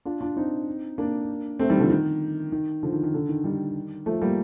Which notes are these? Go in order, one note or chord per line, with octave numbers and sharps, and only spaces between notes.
D4 F4
D4 F4
C4 D#4
A#3 D4
A3 C4
D#3 G3
D3 F3
D#3
D#3
D3 F3
D#3
D#3
D3
D#3
D#3 G3
F3 A3
G3 A#3